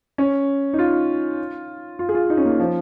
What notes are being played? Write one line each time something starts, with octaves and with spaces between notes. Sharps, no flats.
C#4
D#4
F4
F4
G#4
F4
D#4
C#4
A#3
F3